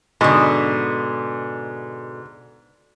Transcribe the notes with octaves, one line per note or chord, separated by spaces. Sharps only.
G#2 B2 D3